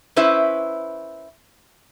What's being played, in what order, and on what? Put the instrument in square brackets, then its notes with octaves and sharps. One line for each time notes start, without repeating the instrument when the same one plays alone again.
[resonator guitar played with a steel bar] C#4 E4 B4 C5 E5